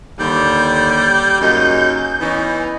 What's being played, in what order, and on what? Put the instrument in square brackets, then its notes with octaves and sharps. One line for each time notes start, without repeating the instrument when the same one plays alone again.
[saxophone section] D#2 D3 [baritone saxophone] G3 [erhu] G6
[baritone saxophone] F#2 [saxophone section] C#3 A#3 D#4
[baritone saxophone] E3 [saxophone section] B3 C#4 D#4